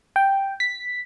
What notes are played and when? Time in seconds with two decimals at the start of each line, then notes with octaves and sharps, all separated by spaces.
0.16 G5
0.60 B6